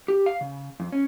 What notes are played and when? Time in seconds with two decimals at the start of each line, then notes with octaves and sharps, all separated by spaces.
0.08 G4
0.26 F5
0.41 C#3
0.80 F2
0.92 C#4